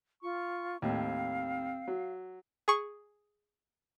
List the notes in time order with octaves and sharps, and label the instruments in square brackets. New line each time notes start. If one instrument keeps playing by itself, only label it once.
[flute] F4 [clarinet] C#6
[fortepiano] D#2 A2 [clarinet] C4 [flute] F5
[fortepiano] F#3
[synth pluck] G#4 C#6